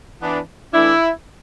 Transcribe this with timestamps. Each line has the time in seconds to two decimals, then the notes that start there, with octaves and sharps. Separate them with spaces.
0.21 E3 B3 D4
0.73 E3 A3 D4 E4